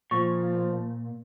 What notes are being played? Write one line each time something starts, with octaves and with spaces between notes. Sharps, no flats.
A#2 F3 C#6